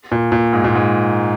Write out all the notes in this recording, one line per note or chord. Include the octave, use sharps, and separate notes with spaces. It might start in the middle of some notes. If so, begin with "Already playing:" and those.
A#2
A#2
G#2
A#2
G#2